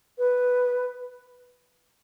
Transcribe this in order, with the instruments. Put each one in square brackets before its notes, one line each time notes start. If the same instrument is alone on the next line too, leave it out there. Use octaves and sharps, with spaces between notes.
[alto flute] B4